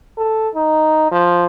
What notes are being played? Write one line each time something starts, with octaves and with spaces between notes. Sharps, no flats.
A4
D#4
F3